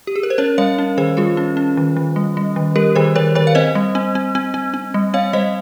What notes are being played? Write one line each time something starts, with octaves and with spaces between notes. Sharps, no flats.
G4
G#4
A#4
C5
C#4 A#4 C#5
G3 C#5 F5
C#4
D#3 G#4 C5
G3 F4 G#4
C#4
C#4
D#3
D#3
G3
G3
D#3
G3 G4 A#4
D#3 G#4 C5
D#3 A#4 C#5
D#3 A#4 C#5
F5
C4 C5 D#5
G3
C4
C4
C4
C4
C4
G3
C4 C#5 F5
G3 C5 D#5